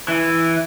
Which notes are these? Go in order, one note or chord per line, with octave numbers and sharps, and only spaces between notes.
E3